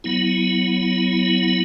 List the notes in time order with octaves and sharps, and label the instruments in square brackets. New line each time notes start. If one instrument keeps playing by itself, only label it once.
[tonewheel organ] F#3 B3 E4